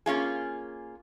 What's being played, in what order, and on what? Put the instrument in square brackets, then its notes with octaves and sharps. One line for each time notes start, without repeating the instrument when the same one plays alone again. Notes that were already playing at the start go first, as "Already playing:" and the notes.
[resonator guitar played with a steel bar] A#3 C#4 F4 G#4